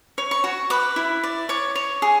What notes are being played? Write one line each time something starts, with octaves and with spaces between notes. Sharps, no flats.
C#5
C#6
F#4
B4 D6
E4
D5
C#5 D6
C#5
G#4